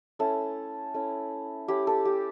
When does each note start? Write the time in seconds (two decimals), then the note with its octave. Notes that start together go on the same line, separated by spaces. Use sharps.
0.19 A3 C#4 E4 A4
0.94 A3 C#4 E4
1.68 A3 C#4 E4 G4
1.87 A4
2.05 G4